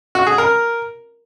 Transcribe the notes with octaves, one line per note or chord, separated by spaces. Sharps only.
F#4
G#4
A#4